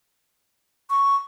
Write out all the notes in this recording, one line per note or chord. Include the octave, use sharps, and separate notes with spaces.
C#6